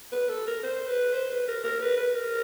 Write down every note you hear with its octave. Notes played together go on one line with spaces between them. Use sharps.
B4
A4
A#4
C5
B4
C5
B4
A#4
A#4
B4
B4
A#4